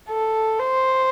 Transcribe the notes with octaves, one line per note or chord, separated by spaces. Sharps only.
A4
C5